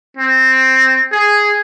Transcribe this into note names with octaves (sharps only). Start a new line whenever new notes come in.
C4
G#4